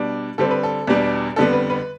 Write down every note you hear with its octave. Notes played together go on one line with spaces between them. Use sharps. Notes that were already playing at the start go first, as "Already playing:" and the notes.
Already playing: B2 G3 D4
D3 G3 C4 A4
B4
A4
E2 B2 G3 D4
F2 D3 G3 B3 A4
B4
B4